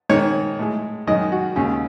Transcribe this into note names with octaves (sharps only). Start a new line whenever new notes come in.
G#2 D#3 G#3 C#5
A2 G#3
F#2 D#3 G#3 D#5
F#4
D#2 C#3 G#3 C#4